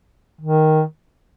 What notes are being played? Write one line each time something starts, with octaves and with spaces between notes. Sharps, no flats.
D#3